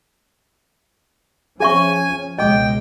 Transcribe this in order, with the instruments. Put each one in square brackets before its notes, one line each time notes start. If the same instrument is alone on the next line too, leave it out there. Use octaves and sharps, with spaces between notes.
[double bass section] F3 C#4 [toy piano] G#4 E5 C#6 [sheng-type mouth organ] G#5
[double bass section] C#2 B2 G#3 [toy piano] D#5 D6 [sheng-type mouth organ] G5